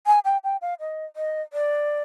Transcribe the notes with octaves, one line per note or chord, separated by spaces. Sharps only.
G#5
G5
G5
F5
D#5
D#5
D5